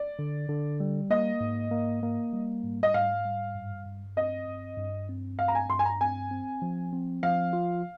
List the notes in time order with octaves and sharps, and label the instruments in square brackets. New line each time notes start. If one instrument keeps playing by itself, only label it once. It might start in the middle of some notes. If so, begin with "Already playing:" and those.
Already playing: [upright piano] D5
[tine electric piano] D3
D3
G3
[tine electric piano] A#3 [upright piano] D#5
[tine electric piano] G#2
A#3
A#3
G3
G#2
[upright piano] D#5
[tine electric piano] G#2 [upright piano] F5
[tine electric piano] G3
G2
G2
[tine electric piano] C4 [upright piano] D#5
[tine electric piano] G2
G2
C4
[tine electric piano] G2 [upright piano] F5
[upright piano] A#5
G#5
[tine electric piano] G2 [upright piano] C6
[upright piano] G#5
A#5
[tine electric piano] C4 [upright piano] G#5
[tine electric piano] C4
F3
C4
[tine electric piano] F3 [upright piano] F5
[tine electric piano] F4